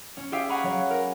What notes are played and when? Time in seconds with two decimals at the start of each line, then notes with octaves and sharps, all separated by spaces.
0.17 C#4
0.32 G4 G#4 E5 F5 G5
0.49 F5 F#5 G#5 A#5 B5 C#6
0.63 F#3 C#5
0.91 A#4